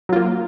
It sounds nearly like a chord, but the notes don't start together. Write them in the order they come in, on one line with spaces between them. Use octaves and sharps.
F#3 F4 A#3